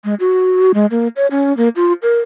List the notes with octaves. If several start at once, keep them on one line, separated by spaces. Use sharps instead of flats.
G#3
F#4
G#3
A#3
C#5
C#4
A#3
F4
A#4